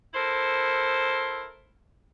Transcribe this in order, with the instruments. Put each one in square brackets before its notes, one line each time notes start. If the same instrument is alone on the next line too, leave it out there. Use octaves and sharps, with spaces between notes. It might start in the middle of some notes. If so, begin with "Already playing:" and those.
[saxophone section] E4 A4 A#4 C5